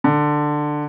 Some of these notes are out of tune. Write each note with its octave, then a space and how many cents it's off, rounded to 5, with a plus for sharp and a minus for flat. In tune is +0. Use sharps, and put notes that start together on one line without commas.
D3 +15